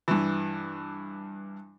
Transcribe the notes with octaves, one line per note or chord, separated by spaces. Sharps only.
G2 E3